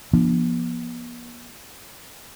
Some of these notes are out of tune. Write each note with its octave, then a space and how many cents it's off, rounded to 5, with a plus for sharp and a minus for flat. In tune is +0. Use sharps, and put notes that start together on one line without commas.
F3 -30 B3 -45 D4 +0